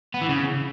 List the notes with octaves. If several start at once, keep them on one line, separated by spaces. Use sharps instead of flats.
B3
E3
C#3